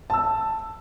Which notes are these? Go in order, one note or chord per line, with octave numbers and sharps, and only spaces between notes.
A5 E6